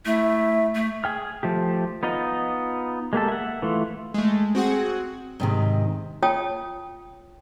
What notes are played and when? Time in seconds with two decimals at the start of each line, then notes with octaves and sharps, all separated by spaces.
0.05 A3 E4
0.75 A3
1.04 G#4 G5 F6
1.43 F3 A3 G4
2.03 B3 D#4 F4 D#5
3.13 G#3 A#3 G4 A4
3.28 E5 F#5
3.62 E3 A3 F4
4.14 G#3 A3
4.55 C4 F#4 G#4 F#5
5.40 G#2 C3 D#3
6.22 F4 C#5 G5 A5 D#6